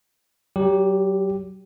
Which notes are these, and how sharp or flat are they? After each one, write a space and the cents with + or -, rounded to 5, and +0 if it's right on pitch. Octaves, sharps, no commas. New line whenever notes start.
F#3 +35 G4 +0